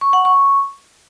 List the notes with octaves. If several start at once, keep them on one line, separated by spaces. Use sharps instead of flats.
C#6
F#5
C#6